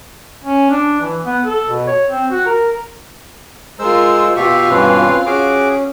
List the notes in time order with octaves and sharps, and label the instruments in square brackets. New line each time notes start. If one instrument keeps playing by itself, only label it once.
[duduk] C#4
D4
E3
B3
A4
B2
C#5
C4
F#4
A#4
[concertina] G#3 C5 E6 [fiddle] F4 A#4
[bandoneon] B2 G4 E5 [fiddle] F4 F5 [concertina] C#6
[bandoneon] G2 B2 E3 [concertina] C4 C#4 B4
[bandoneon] C#4 [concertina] F#4 G#4 D6